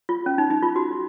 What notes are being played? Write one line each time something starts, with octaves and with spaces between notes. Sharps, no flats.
F4
C#4
D#4
D#4
F4
F#4